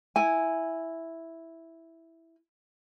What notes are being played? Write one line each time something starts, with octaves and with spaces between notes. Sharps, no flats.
E4 G#5